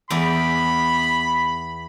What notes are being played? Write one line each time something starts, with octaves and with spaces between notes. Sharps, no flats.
E2 B3 D5 B5